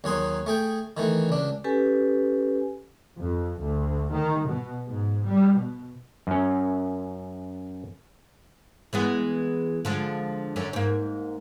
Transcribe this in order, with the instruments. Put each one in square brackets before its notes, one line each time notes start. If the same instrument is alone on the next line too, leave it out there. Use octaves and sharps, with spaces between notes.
[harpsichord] D#2 F#3 G#4 C6 D#6
A3 G#4 G5
D#3 E3 A3
C#2 D4
[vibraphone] C#4 G4 A4 B4 G#5
[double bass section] F2
D2
D#3
B2
G#2
G3
B2
[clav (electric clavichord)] F#2 C#4
[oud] E3 G#3 B3
D3 F3 G#3
F#2 D3 C#4
G#2 A#3